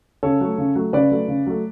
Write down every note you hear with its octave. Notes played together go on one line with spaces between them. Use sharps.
C#3 A4 C#5
F#3 A3
C#3
F#3 A3
C#3 B4 D5
F#3 A3
C#3
F#3 A3